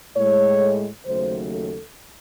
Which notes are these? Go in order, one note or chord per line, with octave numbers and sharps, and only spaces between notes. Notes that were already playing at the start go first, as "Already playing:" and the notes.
A2 G#3 C#5
D#2 C#3 F#3 A3 C5
A4